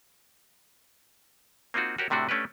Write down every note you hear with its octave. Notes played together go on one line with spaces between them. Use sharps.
A#3 C4 D#4 F4 F#4
F#4 G4 A#4 C#5
A2 C3 A3 D4 F#4
A3 C#4 D4 G4 B4